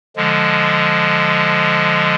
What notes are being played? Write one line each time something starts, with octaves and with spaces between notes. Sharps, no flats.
D3 F3 G#3